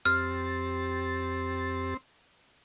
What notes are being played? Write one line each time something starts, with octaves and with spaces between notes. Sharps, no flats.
F2 C4 G4 F6 A6